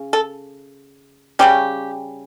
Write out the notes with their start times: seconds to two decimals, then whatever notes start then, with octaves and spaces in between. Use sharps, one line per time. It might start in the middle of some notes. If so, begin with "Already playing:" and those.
Already playing: C#3
0.13 A4
1.39 C#3 G3 C#4 G4